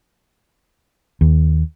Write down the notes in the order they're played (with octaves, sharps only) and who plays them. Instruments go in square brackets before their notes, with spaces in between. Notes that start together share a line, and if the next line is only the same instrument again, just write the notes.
[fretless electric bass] D#2